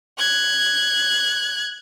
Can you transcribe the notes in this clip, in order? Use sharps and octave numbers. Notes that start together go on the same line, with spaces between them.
F#6 G#6